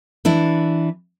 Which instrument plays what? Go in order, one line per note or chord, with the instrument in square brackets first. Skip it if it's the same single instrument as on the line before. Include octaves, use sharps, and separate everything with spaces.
[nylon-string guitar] E3 D4 E4